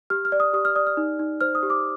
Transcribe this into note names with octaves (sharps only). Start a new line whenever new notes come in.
G4 F6
F6
D5
D#6
G4 D#6
F6
D5 D#6
F6
D#4
D#4
C5 F6
D#6
G4
D6